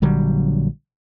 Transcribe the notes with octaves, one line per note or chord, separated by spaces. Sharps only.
A#1 D3 F#3 G3